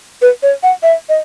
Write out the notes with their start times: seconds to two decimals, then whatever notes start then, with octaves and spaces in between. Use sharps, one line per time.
0.22 B4
0.43 C#5
0.63 F#5
0.83 E5
1.09 D#5